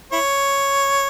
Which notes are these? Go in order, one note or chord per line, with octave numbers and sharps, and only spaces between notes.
E4 C#5